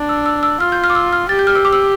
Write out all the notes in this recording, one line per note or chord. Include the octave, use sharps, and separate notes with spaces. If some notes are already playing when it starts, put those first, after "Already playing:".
Already playing: D4
E6
E6
E6
F4 F6
G6
F6
D6
E6
F6
G4 A6
G6
F6
E6
D6
E6